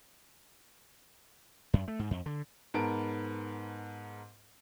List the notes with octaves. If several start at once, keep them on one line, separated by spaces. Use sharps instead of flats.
F#2
A3
G#2
F2
D3
G#2 B3 A#4 A5 D7